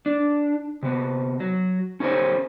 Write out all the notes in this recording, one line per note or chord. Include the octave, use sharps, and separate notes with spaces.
D4
C3 B3
F#3
C#4 G4 A#4 C5 C#5